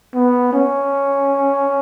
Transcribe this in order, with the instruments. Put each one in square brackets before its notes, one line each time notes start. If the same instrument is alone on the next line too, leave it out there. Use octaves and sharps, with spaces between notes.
[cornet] B3
C#4